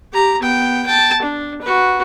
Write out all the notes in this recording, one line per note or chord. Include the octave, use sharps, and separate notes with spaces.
G4 A#5
B3 G5
G5 A5
D4
F#4 B4